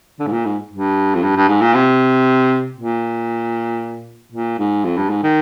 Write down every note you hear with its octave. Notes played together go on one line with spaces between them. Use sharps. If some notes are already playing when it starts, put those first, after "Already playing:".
D3
G#2
A#2
G#2
G2
F2
G2
G2
G#2
A#2
C3
A#2
A#2
G#2
F2
G2
G#2
D#3